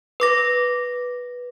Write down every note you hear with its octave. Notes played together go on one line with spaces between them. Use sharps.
B4 D6 A#6